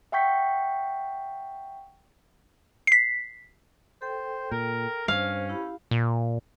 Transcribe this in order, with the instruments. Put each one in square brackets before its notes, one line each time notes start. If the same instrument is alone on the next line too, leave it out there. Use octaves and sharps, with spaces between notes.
[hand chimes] E5 F#5 G5 C#6 G6 B6
[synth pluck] B6 C7
[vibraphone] A4 G5 [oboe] C5
[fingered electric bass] A#2 [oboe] A#4
[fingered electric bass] G2 [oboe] C#4 [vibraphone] C5 [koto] F5
[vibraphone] E4 G4 B5
[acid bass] A#2